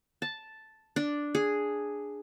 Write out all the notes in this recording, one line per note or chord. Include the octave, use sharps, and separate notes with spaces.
A5
D4
G#4